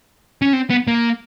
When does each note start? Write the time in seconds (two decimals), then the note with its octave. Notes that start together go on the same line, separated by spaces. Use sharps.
0.42 C#4
0.53 C4
0.70 B3
0.87 A#3